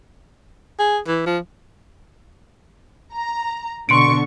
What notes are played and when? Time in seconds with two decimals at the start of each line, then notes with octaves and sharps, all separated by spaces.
0.79 G#4
1.07 E3
1.26 F3
3.13 A#5
3.89 B2 D3 C6 C#6 C#7 D7